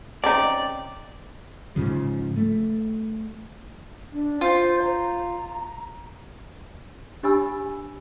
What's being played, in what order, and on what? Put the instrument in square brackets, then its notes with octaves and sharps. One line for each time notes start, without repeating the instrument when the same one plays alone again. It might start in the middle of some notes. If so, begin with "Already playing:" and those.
[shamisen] C#3 C4 D#4 [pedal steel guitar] D5
[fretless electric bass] G#2 C#3 F3
A3
[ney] D4
[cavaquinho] F4 [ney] C5
[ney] A#5
[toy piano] D4 G4 D#5 G#5 B5 E6